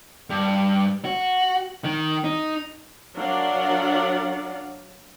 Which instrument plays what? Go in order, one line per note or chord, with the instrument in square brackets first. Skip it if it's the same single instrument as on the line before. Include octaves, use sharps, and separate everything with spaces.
[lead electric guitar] G2
F#4
D#3
D#4
[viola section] F#3 D4 A#4 D5 F5 F#5